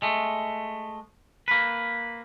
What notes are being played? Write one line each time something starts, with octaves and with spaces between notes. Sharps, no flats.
G#3 A3
A#3 B4